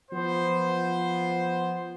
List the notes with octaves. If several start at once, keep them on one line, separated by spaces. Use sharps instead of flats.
F3 B3 C5